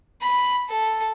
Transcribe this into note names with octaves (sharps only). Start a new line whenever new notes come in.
B5
A4